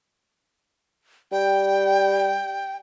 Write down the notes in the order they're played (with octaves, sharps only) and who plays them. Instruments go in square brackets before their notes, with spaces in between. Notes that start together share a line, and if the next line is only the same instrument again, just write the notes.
[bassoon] G3 [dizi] G5